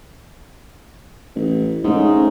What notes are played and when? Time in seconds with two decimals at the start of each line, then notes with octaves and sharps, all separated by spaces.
1.35 A1
1.84 G#2 A3 C#4 D#4